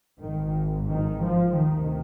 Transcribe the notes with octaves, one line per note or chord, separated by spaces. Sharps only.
G#1 G#2 D#3
D#3
F3
D2 C3 D#3